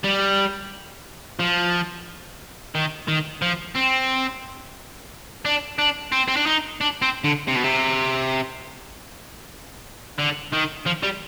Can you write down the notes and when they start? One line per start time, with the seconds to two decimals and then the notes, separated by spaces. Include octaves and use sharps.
0.04 G3
1.39 F3
2.75 D#3
3.08 D#3
3.42 F3
3.76 C4
5.45 D4
5.78 D4
6.12 C4
6.28 C4
6.36 D4
6.46 D#4
6.81 D4
7.02 C4
7.25 D3
7.48 C3
7.56 B2
7.64 C3
10.18 D3
10.52 D#3
10.86 F3
11.03 G3